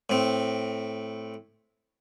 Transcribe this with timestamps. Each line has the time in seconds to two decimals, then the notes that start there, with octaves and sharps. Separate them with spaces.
0.10 A2 C4